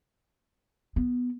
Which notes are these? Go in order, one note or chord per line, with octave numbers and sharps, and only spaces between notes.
B3